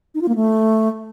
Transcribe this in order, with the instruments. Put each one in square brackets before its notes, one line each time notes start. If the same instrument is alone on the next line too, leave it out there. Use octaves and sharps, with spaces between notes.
[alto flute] D#4
F4
A#3
A3